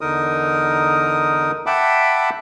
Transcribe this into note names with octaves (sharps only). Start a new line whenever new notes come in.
E2 D3 D#4 A#4 D#6
E5 F#5 G5 A5 B5 D6